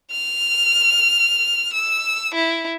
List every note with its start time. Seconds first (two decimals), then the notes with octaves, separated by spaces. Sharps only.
0.12 F6
1.74 E6
2.35 E4